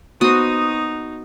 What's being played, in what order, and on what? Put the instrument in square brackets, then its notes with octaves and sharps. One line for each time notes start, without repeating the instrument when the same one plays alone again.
[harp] B3 [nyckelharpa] D#4 [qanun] F#4 C5 [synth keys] D#6